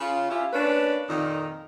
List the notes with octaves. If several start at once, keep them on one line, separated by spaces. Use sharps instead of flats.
C#3 F4
C#4 E4 F4 G4
A#3 C#4 D4 B4
F2 A#2 D#3 D#4